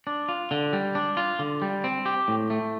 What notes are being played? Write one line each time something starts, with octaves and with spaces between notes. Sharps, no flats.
D4
F4
D3
G3
D4
F4
D3
G3
C4
G4
A2
A3